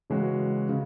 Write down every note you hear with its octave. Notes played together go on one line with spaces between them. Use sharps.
C#3 E3 G#3 C#4 F#4
C#3